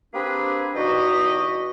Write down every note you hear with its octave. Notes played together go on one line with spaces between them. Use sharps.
A#3 C4 D4 G4 G#4 B4
E2 G2 D#4 F#4 G4 D#5